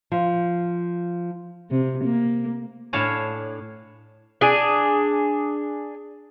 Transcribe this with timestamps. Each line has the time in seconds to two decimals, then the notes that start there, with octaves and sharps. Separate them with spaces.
0.12 F3
1.71 C3
2.04 A#3
2.93 A2 D4 C#5 F5 G#5 A5
4.41 D4 G#4